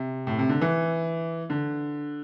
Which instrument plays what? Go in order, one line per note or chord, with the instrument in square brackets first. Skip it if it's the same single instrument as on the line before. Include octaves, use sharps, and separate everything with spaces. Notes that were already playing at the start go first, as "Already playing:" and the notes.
Already playing: [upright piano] C3
A2
C3
D3
E3
D3